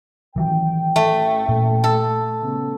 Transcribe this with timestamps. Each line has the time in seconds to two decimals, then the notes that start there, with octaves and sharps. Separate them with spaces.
0.36 A1 D#3 E3 F#3 G5
0.96 A3
1.49 A#2
1.84 A4
2.42 C#3 B3